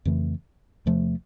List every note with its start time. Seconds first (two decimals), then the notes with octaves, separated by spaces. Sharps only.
0.05 F2 C#3 E3 A3
0.86 E2 C3 F3 A3